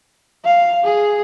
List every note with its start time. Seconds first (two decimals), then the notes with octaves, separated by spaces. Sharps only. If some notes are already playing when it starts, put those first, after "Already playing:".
0.44 F5
0.84 G#4